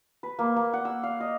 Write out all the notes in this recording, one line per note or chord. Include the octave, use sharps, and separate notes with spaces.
B4
A#3
A#3
F#5
E6
F5
D#5